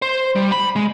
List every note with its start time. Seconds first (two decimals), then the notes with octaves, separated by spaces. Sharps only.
0.02 C5
0.36 G3
0.52 B5
0.76 G#3